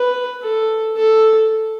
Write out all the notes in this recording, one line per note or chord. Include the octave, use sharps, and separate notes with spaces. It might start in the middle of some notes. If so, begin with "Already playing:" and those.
Already playing: B4
A4
A4